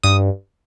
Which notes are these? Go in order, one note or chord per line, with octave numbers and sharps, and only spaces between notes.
G2 D#6